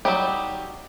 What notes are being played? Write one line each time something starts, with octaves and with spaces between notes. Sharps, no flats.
F#3 G3 D#4 G4